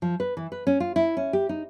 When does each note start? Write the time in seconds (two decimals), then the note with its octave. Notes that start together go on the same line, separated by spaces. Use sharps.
0.02 F3
0.20 B4
0.37 E3
0.52 B4
0.67 C#4
0.80 F4
0.96 E4
1.17 C#4
1.33 G4
1.49 D#4